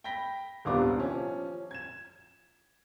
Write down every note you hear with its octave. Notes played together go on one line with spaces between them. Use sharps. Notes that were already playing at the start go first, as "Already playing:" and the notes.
G5 B5 A#6 B6 G7
D#1 C2 B3 D4 F5 D6
F3 C#4
G#6 E7